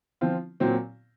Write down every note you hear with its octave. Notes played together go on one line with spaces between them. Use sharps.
F3 C4 F4
A#2 F#3 C4